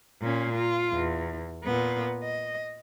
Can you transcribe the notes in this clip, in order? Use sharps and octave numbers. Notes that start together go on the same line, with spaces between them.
A#2 C#4
F4
E2
A#2 B3
D#5